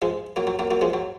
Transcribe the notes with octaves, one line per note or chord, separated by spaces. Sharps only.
F3 G#3
F#3 A#3
F#3
F#3 A#3
F#3 A#3
F3 G#3
F#3